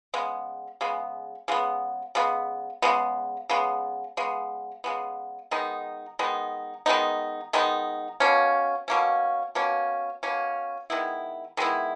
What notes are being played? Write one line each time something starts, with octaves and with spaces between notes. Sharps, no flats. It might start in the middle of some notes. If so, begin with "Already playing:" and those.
C#3 G#3 B3
C#3 G#3 B3
C#3 G#3 B3
C#3 G#3 B3
C#3 G#3 B3
C#3 G#3 B3
C#3 G#3 B3
C#3 G#3 B3
D#3 G#3 B3 D#4
D#3 G#3 B3 D#4
D#3 G#3 B3 D#4
D#3 G#3 B3 D#4
B2 A#3 C#4
B2 A#3 C#4
B2 A#3 C#4
B2 A#3 C#4
D#3 G#3 B3 E4
D#3 G#3 B3 E4